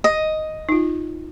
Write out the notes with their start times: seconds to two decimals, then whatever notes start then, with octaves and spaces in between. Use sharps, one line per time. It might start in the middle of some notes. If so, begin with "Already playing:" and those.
0.04 D#5
0.69 D#4 F4